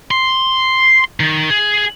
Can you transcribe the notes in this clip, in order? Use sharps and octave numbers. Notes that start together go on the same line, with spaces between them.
C6
D#3
G#4